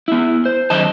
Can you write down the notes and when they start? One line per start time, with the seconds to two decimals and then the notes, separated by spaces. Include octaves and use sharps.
0.08 B3 E4
0.46 C5
0.70 F#2 D#3 D#5 A5